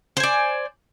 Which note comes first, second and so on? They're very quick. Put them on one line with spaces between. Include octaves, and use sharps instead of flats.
C5 G#5 D5